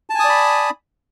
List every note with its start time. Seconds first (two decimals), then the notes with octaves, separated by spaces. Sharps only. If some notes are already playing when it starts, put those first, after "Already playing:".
0.10 A5
0.15 G#5
0.20 D#6
0.24 D5
0.29 B5